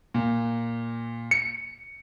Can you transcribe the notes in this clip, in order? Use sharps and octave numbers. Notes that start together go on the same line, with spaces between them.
A#2
C#7